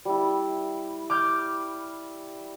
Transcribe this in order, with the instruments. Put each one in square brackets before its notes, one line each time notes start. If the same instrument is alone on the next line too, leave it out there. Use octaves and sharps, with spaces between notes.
[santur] G3 E4
[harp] D6 F6 G6